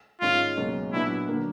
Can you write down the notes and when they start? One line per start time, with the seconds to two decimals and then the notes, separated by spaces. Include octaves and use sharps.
0.21 G#2 D#3 G#3 C#4 F4
0.57 C#2 B2 F#3 A#3 C#4
0.93 A#2 F#3 B3 D4 E4 F#4
1.28 D3 F#3 A#3